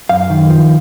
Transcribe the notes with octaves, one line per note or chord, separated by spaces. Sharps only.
F#2 F5
D#3
F3